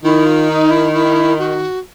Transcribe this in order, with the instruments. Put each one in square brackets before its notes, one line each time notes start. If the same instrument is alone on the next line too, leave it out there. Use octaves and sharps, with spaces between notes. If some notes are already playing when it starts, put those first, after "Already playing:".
[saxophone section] D#3 [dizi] E4
[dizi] F4
D#4
E4
E4
F#4